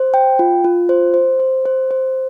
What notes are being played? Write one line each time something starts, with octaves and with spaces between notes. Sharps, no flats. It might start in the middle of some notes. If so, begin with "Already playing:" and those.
Already playing: C5
G5
F4
F4
C5
C5
C5
C5
C5